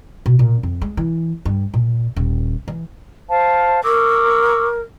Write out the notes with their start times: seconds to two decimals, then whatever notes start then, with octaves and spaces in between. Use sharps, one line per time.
0.26 B2
0.39 A#2
0.63 F2
0.82 G#3
0.97 E3
1.45 G2
1.74 A#2
2.16 D#1
2.68 E3
3.29 C5 F5 A5
3.83 A#4 C#6 D6 E6